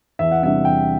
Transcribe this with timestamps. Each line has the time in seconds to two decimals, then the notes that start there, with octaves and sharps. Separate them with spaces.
0.19 E2 E5
0.31 F#5
0.42 C3 G3 D4 E5
0.65 E2 G5